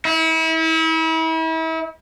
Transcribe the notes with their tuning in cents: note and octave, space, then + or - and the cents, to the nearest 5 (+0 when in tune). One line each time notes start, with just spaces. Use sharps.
E4 -35